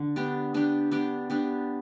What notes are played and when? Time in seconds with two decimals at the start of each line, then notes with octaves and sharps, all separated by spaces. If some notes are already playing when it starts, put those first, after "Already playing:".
Already playing: D3
0.16 B3 D4 G4
0.54 B3 D4 G4
0.91 B3 D4 G4
1.30 B3 D4 G4